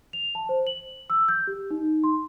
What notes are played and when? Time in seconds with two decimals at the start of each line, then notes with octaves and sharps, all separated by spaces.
0.13 F7
0.35 A5
0.49 C5
0.67 F#7
1.10 E6
1.29 G6
1.47 G4
1.71 D#4
2.04 C6